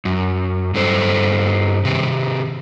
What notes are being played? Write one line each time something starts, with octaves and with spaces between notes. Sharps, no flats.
F#2
G2 A4 C5
C3 D#3 G4